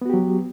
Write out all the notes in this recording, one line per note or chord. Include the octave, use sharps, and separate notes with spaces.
F#3 B3 F#4 G4